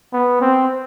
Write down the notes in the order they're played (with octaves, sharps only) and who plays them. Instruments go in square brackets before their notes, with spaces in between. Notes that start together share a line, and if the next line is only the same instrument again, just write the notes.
[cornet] B3
C4